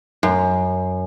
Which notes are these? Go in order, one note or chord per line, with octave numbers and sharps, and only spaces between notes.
F#2